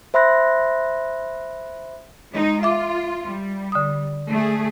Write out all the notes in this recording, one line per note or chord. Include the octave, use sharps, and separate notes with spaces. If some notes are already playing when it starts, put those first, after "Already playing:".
C5 E5 B5 C6 F#6 A#6
G#3 D#4
F4 E5 D6
G3
D3 D#6
A3 G#4